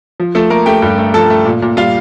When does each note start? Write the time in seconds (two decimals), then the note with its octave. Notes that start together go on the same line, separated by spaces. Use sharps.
0.20 F3
0.35 F3 A3 A4
0.50 A3 A#3 A#4
0.66 A3 G4 G5
0.82 G2
0.98 A3
1.14 F3 A4 A5
1.30 A3
1.45 A#2
1.62 A#2
1.77 G3 F4 F5